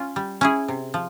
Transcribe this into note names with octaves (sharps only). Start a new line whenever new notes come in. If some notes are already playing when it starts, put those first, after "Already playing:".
Already playing: C#4 F4
G3
C#4 E4 G#4
C3
F3